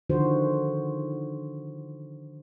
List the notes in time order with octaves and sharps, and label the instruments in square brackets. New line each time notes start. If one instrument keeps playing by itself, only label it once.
[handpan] D3 D#3 F3 F#4 C5